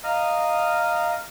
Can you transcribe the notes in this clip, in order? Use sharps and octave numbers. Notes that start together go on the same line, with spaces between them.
D#5 F5 A#5 D#6 F6